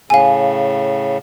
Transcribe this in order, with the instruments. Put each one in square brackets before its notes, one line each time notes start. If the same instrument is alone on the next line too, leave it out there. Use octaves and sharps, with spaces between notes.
[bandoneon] A2 C#3 [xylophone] F5 G#5